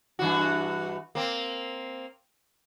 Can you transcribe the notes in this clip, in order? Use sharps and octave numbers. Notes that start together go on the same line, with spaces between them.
G2 E3 F#4
A#3 C4